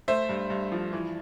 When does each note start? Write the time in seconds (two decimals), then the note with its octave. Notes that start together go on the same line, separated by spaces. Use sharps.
0.08 A3 C5 E5
0.29 G2
0.50 G2
0.72 F3
0.93 E3